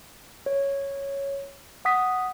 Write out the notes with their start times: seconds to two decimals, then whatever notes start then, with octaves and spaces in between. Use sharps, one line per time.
0.46 C#5
1.85 F#5 D#6 B6